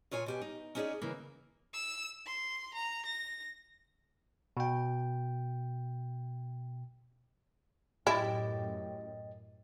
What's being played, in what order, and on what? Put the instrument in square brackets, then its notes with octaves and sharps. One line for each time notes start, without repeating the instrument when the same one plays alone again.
[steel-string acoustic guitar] A#2 F4 C#5 G#5
B2 G4 G#5
D#4
C#4 D#4 E4 G#4 C#5 D5
C#3 E3 A#3
[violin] E6
C6
A#5
A#6
[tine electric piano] B2 G5
[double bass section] F#2 A2 [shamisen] E4 [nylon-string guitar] G4 [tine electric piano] D#5 G5 A6